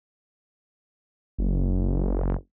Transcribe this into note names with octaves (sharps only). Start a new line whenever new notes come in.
F#1